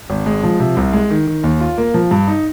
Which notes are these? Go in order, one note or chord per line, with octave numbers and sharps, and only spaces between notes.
G#1
G#3
F3
C3
C2
G#3
D#3
D#3
D#2
F4
A#3
F3
G2
D#4